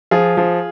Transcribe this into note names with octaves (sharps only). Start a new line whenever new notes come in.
F3 F4 G#4
F3